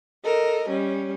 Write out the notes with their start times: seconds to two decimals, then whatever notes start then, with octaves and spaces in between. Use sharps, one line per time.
0.25 A4 A#4 D#5
0.70 G3 C#4